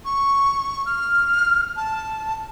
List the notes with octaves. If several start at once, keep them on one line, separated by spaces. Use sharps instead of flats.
C#6
F6
A5